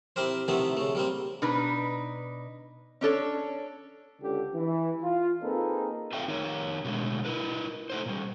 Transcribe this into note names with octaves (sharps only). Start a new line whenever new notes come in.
C4 E4 G4 A#4 C5
C3 D#3 A3 B3 C4 E4
C#3 A3
G3 A#3 C4
B2 D4 D#4 B4
C#4 D4 A4 C#5
C#2 D3 G4
E3
F4
A#3 C4 D#4 G#4 A4 B4
F4 A4 A#4 E5 F5 G5
D#3 D#4 A#4 C#5
B2 D3 F3 G#3 A3
E4 A#4 B4
A3 D#4 C5
A#2 G3